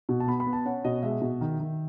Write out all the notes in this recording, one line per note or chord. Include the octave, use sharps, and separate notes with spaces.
B2
A5
B3 B5
B5
B3
A5
C#4 F#5
B2 D#5
G#3 E5
B2
D#3
D#3